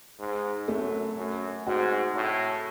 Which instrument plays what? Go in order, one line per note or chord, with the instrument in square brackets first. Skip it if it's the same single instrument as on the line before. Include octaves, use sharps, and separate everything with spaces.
[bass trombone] G#2
[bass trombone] F#2 [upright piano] A3
[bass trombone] F#2
[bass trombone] G#2 [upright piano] F#4
[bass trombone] A2